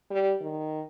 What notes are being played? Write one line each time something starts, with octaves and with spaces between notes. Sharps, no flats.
G3
D#3